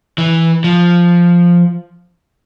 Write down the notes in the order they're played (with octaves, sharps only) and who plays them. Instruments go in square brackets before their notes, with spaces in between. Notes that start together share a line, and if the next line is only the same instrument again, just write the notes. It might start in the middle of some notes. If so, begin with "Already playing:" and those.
[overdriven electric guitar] E3
F3